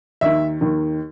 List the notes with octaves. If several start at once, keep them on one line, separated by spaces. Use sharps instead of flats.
D#2 D#3 E5
D#2 D#3